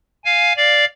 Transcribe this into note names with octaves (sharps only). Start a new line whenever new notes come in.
F5 G#5
D5 F5